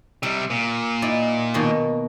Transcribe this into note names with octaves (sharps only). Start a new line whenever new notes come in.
C3 G3 E5
A#2
D#4 E4 D5
B2 D#3 A#3